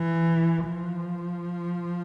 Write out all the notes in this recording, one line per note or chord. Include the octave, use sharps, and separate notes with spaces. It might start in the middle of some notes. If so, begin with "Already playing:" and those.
Already playing: E3
F3